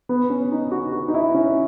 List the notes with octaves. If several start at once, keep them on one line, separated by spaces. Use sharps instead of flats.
B3
C#4
D#4
F#4
F#4
D#4
E4
C#4